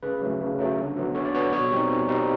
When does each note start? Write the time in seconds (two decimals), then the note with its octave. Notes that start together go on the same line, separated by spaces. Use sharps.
0.03 C#3 B4
0.21 F#3 A3
0.41 C#3
0.59 F#3 A3
0.77 D3
0.96 F#3 B3
1.15 D3 C#5
1.25 D5
1.34 F#3 B3 C#5
1.53 B2 C#5
1.71 G3 C4 D#4
1.90 B2
2.08 G3 C4 D#4